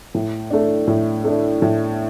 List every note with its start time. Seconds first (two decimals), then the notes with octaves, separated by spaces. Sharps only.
0.15 A2
0.51 A3 D4
0.87 A2
1.24 A3 D4
1.62 A2